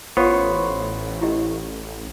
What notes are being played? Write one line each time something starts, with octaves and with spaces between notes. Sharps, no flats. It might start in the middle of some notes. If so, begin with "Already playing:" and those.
A1 B3 F4 C5 C#5 F5
E4 G4 D#5